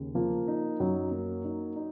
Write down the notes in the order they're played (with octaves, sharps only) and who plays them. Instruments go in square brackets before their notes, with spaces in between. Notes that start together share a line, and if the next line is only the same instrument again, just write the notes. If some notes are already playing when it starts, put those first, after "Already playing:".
Already playing: [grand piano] D#2 C#3
[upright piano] F3 [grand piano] A#3
[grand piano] D#4
[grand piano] F#2 [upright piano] F#3
[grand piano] A#3
D#4
D#4